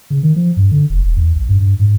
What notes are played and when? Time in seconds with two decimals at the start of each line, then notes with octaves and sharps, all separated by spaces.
0.10 C#3
0.23 D#3
0.36 F3
0.57 G2
0.71 D3
0.90 F1
1.03 D#1
1.16 E2
1.36 A#1
1.49 G2
1.60 G2
1.79 G#2